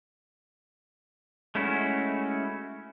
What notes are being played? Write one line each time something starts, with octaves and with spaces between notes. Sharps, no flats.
G#3 A3 C#4 E4 F#4